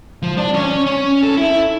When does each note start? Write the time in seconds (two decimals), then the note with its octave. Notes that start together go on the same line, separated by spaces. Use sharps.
0.22 F3
0.38 D4
0.54 C#4 C#5
0.87 C#4
1.23 A4
1.37 E4